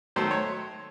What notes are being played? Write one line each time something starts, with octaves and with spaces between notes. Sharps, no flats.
D#3 F#3 A3 C5
C#5